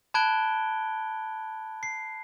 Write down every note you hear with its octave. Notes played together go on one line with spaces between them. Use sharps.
A5 B5 F#6 G#6 D7 G7
C7